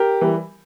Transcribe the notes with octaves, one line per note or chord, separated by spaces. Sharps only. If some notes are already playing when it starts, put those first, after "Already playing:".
Already playing: G4 A#4
E3 G3